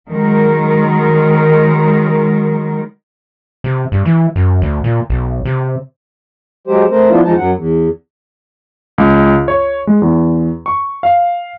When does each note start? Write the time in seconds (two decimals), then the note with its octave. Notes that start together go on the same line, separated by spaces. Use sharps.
0.10 D#3 F#3 G#3 A#4
3.64 C3
3.92 G2
4.05 E3
4.36 F#2
4.62 D2
4.84 A#2
5.10 B1
5.45 C3
6.67 F#3 G#3 G4 C5
6.91 A3 C4 A#4 C5
7.10 F3 B3 D4 E4 F4
7.24 E2 F3 G#3 D#4 A5
7.37 F#2 F#3 F#5
7.55 E2
8.98 C#2
9.48 C#5
9.87 G#3
10.02 E2
10.66 C#6
11.03 F5